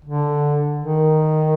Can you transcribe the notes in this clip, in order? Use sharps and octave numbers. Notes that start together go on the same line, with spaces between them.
D3
D#3